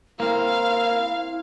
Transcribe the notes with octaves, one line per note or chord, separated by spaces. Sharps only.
A#3 C4 E4 F5